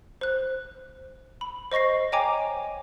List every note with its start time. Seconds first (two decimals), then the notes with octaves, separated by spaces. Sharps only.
0.21 C5 F#6
1.41 B5
1.72 C5 D#5 C#6 A#6 C7
2.12 C#5 D#5 G5 G#5 A#5 D6